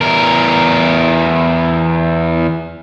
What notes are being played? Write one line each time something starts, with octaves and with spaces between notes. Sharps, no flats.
E2 A#4